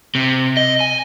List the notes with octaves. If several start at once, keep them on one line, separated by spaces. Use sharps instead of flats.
C3
D#5
G#5